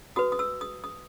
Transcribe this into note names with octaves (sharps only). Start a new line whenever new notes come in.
F#4 B4 D#6
D#6
E6
D#6
D#6